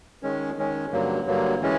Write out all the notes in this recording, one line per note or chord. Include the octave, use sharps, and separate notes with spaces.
D#3 G#3 C#4
D#3 G#3 C#4
G2 D3 F#3 A#3
G2 D3 F#3 A#3
E3 G#3 C#4